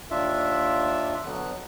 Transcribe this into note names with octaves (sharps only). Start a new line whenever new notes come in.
D#2 D4 F4 E5
B2 D3 F#3 B3 F#6